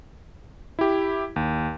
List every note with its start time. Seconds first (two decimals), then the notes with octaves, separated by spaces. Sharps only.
0.79 E4 G4
1.36 D#2